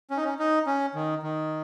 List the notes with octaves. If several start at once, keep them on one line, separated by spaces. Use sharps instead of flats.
C#4
D#4
C#4
D#4
C#4
D#3
D#3